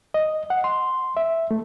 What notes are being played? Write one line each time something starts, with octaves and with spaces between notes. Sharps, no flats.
D#5
F#5
C6
E5
A3